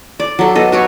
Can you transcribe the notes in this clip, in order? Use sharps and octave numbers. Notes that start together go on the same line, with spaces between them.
D5
F#3 A4
B3 A4 D#5
F#4 B4 C#5